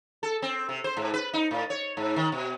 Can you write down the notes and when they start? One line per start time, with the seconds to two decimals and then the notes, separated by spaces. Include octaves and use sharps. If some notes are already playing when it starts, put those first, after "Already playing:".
0.23 A4
0.42 C4
0.69 C3
0.84 C5
0.97 G#2
1.14 B4
1.33 D#4
1.51 A2
1.70 C#5
1.97 G#2
2.16 D#3
2.32 B2